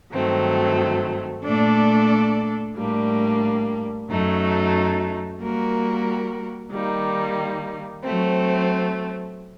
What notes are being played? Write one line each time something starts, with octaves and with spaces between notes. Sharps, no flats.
G2 D#3 F#3 A3 C4
A#2 A3 D4 A4 D5
A2 G3 A#3 D4
F#2 F#3 A3 D#4
G3 A#3 F#4 A#4
D#3 G3 A#3 D#4
F#3 A3 C4